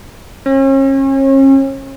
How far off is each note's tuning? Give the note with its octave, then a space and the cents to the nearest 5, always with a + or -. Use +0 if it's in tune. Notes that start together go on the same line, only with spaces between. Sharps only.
C#4 -40